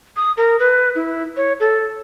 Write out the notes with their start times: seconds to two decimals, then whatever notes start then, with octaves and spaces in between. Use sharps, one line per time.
0.17 D#6
0.37 A#4
0.59 B4
0.95 E4
1.37 C#5
1.60 A4